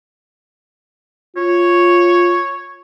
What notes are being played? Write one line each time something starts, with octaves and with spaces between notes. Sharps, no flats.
F4 C#5